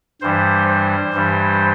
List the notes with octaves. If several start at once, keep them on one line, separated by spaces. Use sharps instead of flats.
G2 E3 G3 C5
C5
G2 E3 G3